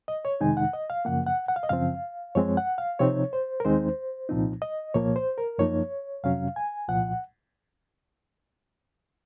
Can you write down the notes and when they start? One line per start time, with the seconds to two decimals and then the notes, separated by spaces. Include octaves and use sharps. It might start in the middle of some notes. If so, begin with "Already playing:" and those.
0.08 D#5
0.25 C#5
0.41 F2 C3 D#3 G#3 D#4 G#5
0.57 F#5
0.73 D#5
0.90 F5
1.05 F#2 C#3 F3 A#3 F#5
1.27 F#5
1.48 F#5
1.56 F5
1.63 D#5
1.69 F#2 C#3 F3 C4 F5
2.35 F#2 F3 G#3 C4 C#5
2.57 F#5
2.78 F5
2.99 C3 F3 C4 D#4 C#5
3.33 C5
3.60 A#4
3.65 D#2 D#3 G#3 C4 D#4 C5
4.29 C2 A#2 F3 C4 D#4
4.62 D#5
4.94 C2 A#2 F3 A#3 C#5
5.16 C5
5.38 A#4
5.58 F#2 F3 A#3 D#4 C#5
6.24 F2 C3 F#3 C#4 F5
6.56 G#5
6.88 C2 A#2 F3 F#5